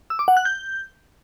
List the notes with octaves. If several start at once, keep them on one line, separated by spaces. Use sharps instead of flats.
E6
D6
F#5
F#6
G6